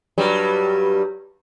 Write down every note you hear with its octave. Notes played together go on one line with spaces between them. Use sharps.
G2 F#3 G3